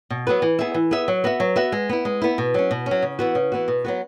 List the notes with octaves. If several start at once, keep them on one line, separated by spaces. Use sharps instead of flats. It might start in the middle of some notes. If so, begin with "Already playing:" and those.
B2
F#3 B3 F#4 B4
E3
B3 G#4 E5
E3
B3 G#4 E5
F#3
B3 F#4 E5
F#3
B3 F#4 E5
G#3
B3 E4
G#3
B3 E4
B2
F#3 C#4
B2
C#4
F#3
C#3
E3 B3 F#4
C#3
E3 B3 F#4
B2
F#3 B3 F#4